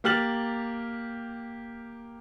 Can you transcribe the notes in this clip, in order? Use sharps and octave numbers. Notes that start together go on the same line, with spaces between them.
A#3 G4 F6 A6 F#7